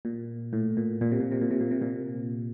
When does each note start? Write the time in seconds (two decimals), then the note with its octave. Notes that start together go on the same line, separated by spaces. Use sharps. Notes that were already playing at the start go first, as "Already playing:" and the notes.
0.05 A#2
0.53 A2
0.77 A#2
1.01 A#2
1.12 C3
1.20 A#2
1.32 C3
1.41 A#2
1.51 C3
1.61 A#2
1.71 C3
1.81 A#2